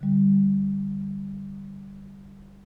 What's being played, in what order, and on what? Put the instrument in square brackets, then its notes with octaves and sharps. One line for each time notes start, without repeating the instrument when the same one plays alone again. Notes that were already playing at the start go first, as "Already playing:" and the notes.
[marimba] D3 G3